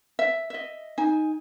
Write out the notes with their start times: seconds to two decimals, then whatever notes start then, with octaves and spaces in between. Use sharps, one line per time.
0.19 E5
0.50 D#5 E5
0.98 D#4 G#5